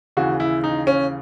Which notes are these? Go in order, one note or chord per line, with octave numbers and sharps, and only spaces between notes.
D#2 C#3 E3 F#4
E4
D#4
C#4